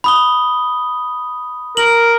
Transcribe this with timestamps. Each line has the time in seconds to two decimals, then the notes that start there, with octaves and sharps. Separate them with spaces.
0.04 B5 D#6 G7
1.77 A#4 F#7